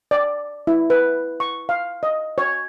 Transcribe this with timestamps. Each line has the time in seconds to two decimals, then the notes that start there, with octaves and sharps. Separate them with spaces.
0.11 D5
0.67 E4
0.90 B4
1.40 C#6
1.69 F5
2.03 D#5
2.38 C#5